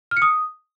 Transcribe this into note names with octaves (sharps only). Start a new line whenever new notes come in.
F6
C#7
D#6